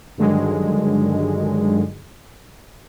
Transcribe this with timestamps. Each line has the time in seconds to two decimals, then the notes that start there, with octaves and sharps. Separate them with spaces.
0.18 G2 D3 D#3 F#3 G#3